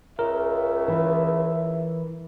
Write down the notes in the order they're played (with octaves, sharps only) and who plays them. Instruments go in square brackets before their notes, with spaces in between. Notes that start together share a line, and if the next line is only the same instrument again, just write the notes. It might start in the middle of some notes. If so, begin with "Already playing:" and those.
[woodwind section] C#2 [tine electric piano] A#4 [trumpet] E5
[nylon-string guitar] E3